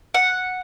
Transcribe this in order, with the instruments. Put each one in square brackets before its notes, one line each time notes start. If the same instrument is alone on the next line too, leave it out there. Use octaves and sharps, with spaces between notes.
[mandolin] F#5